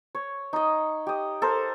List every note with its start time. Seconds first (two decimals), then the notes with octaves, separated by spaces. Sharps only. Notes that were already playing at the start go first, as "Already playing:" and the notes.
0.15 C#5
0.53 D#4 D#5
1.07 G4 D#5
1.42 A4 A#4 C5